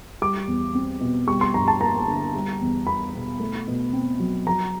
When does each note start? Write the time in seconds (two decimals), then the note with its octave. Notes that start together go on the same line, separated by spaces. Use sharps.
0.22 G3 D6
0.47 E2
0.75 C4
1.01 B2
1.27 G3 C#6
1.41 C6
1.54 G2 A#5
1.68 A5
1.81 A#3 A#5
2.07 D3
2.35 G3
2.61 E2
2.87 B3 B5
3.14 B2
3.40 A3
3.67 B2
3.93 C4
4.20 F#3
4.47 F#3 A#5